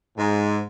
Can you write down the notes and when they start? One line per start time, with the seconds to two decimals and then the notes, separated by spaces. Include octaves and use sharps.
0.17 G#2